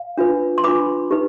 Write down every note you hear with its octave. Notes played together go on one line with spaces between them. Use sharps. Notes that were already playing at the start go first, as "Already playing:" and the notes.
Already playing: F5
D4 F4 B4
C6
D4 F4 B4 B5 D6
D#4 G4 B4